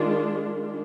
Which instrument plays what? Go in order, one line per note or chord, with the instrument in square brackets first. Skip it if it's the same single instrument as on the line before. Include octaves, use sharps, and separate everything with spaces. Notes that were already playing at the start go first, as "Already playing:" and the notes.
Already playing: [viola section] D#3 G#3 D4 F4